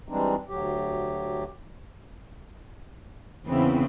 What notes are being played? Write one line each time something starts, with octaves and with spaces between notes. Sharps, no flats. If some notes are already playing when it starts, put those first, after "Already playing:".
E3 G3 G#3 C4 D4 D#4
D2 F#3 G4
E2 C#3 B3 C4 E4